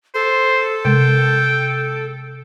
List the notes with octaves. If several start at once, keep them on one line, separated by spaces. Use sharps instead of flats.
A4 C5
C3 G#3 G5